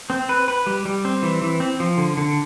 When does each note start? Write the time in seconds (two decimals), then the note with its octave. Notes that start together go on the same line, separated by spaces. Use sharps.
0.10 C4
0.29 B4
0.48 B4
0.66 G3
0.85 G3
1.05 C4
1.23 E3
1.42 E3
1.60 C4
1.80 F3
1.98 D3
2.17 D3